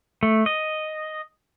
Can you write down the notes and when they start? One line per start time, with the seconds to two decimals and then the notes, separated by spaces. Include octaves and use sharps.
0.23 A3
0.46 D#5